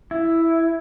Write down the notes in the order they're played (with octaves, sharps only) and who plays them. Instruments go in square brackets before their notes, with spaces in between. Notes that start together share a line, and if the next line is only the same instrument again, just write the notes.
[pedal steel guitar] E4